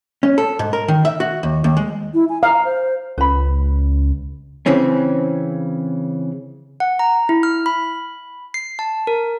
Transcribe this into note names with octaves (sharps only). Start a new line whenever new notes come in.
C#4
A4
G#2
A#4
D#3
E5
F#4
D#2
D#2
G#3
E4
G#5
F5 A#5
C5
C#2 B4 B5
C#3 E3 C4 C#4
F#5
A#5
E4
F6
B5
C7
A5
A#4